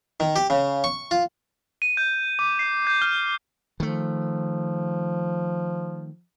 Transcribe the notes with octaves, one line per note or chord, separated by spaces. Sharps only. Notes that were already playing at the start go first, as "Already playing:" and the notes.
D#3
G4
C#3
C#6
F4
D#7
G6
D6
C7
G6
F6
D#3 F3 A3